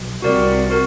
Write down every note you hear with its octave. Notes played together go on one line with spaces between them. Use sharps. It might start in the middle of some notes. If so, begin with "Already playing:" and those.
Already playing: B1
C2 C3 F#4 A#4 D5
F#4 A#4